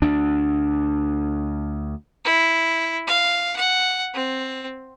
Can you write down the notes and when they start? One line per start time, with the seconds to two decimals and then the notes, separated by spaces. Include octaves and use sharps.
0.02 D2 D4
2.25 E4
3.08 F5
3.57 F#5
4.14 C4